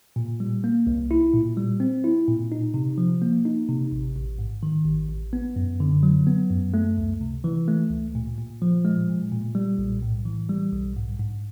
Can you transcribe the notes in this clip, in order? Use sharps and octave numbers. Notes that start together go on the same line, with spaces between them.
A#2
G3
A#3
C2
E4
A#2
G3
C4
E4
A#2
D#4
C3
F3
A#3
D#4
C3
A1
A1
G#2
D#3
A1
A1
B3
F#2
D3
F#3
B3
F#2
A3
C#2
C3
E3
A3
C#2
A#2
A#2
F3
G#3
A#2
A#2
G3
B1
A2
E3
G3
B1
G#2
G#2